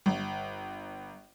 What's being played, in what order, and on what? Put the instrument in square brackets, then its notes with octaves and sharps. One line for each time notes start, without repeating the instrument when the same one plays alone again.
[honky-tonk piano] G1